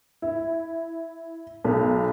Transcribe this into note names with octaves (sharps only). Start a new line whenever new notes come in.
E4
B1